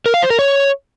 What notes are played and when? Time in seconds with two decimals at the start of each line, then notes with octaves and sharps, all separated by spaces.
0.06 A#4
0.14 F5
0.22 C5
0.30 A#4
0.39 C#5